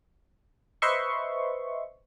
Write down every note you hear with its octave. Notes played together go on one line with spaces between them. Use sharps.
B4 C5 D#5 E5 C6 C#6